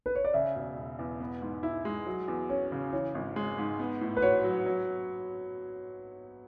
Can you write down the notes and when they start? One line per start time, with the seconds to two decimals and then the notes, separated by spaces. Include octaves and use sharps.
0.06 B4
0.15 C#5
0.25 D5
0.34 C#3 E5
0.55 E1
0.77 E1
0.99 E2
1.20 B3
1.42 G#2
1.63 E4 E5
1.85 G#3
2.07 F#3
2.28 E2
2.49 C#4 C#5
2.72 C#3
2.93 E3 C#5
3.15 G#1
3.36 G#3
3.58 G#2
3.79 B3
4.01 A2
4.17 B4
4.22 F#4 C#5
4.44 F#3
4.66 F#3